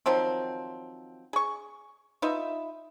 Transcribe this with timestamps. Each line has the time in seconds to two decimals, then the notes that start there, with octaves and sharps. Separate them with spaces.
0.06 D#3 F3 F#3 C4
1.33 G#4 C#6
2.22 D#4 F4 B4 E5